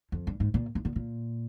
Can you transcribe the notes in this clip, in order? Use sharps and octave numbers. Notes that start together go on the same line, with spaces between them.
F2
G2
G#2
A#2
G2
A#2
A#2